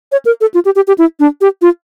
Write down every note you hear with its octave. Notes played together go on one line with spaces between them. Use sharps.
C#5
A#4
A4
F4
G4
G4
G4
E4
D4
G4
F4